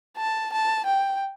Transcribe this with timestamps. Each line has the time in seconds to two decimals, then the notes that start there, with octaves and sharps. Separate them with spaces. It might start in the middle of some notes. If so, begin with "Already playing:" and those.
0.17 A5
0.53 A5
0.86 G5